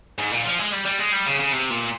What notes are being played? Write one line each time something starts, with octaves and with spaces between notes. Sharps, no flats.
G#2
A#2
F3
G#3
G3
G3
G#3
G3
C#3
C#3
C3
A#2